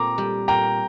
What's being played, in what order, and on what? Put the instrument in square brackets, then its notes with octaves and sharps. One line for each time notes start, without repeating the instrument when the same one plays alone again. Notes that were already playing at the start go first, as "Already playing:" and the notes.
Already playing: [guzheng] A#2 C4 [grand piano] A#5 D6
[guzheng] G3
[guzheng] A#2 [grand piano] G5 A#5